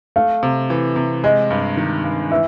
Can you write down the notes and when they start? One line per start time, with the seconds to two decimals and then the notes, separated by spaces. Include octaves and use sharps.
0.16 A3 F5
0.43 C3
0.70 E3
0.96 C3
1.24 G#3 D#5
1.50 G2
1.77 D#3
2.04 G2
2.31 E3 E5